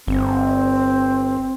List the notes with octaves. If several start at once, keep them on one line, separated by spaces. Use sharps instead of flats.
G1 C4